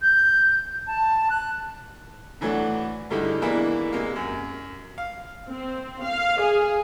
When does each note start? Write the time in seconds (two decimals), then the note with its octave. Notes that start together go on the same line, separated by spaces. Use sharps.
0.01 G6
0.87 A5
1.30 F#6
2.41 A2 E3 F#3 A3 D4 F#4
3.10 G2 D3 G3 G#3 D#4 E4
3.42 B2 E3 G#3 A#3 D4 E4
3.92 C3 G#3 A#3
4.16 F#2
4.98 F5
5.47 C4
6.03 F5
6.41 G#4